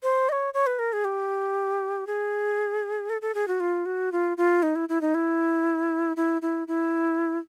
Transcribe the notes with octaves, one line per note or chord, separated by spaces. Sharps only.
C5
D#5
C#5
C#5
B4
A#4
G#4
G4
G#4
A4
A4
G#4
F#4
F4
F#4
F4
F4
D#4
E4
E4
D#4
E4
E4
E4
E4